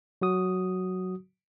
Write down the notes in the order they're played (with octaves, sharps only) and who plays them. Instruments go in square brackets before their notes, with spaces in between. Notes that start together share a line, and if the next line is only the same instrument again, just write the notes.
[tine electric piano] F#3 F#4 D#6